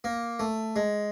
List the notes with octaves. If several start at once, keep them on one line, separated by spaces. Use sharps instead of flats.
A#3
A3
G#3